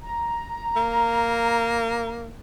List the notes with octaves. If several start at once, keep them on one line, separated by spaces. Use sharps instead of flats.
A#5
A#3